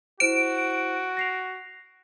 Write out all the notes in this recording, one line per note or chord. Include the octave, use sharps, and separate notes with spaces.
E4 F#4 C5 D7 E7
A#6 C7 F7